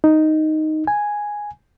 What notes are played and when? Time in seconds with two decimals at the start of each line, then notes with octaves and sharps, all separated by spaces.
0.04 D#4
0.87 G#5